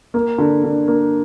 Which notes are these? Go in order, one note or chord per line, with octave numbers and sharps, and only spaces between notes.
A#3
D3
D3
A#3